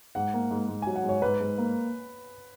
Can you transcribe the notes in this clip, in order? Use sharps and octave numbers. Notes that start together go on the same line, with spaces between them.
G#2 F#5
A#3
G#2
G#2
F#3 G#5
F#5
G#2
C#5
G#2 B4
G#2
A#3